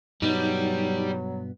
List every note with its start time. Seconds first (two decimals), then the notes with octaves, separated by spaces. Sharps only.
0.22 G2 B2 F#3 G3 B3 D#4